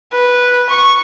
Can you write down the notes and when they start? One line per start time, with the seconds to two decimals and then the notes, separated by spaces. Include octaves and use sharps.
0.12 B4
0.70 C#6